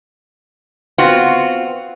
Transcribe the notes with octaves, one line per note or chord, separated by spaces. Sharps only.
B3 C4 F4 F#4